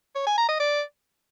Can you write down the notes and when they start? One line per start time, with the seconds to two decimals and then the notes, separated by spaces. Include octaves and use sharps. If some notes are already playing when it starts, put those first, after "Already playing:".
0.15 C#5
0.26 G#5
0.37 A#5
0.49 D#5
0.60 D5